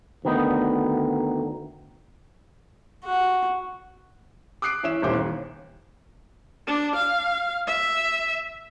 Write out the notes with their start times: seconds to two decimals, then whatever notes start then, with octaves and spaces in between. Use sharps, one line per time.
0.25 D2 D#3 B3 D#4
3.05 F#4
4.62 D6 D#6 F#6 C7 D7
4.83 E3 C#4 E5 E7
5.02 D#1 D#2 E3 C5 D6
5.14 D#2
6.67 D4
6.95 F5
7.67 E5